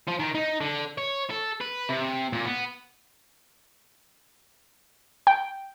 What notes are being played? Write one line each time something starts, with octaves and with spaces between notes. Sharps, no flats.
F3
D#3
D#4
D3
C#5
A4
B4
C3
A#2
B3
G5